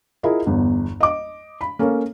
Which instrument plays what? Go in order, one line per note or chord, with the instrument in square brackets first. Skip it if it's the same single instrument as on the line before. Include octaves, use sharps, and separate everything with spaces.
[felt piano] E4 F4 G#4 A#4 D#5
G1 E2
D#5 D6
B5
A#3 C#4 A4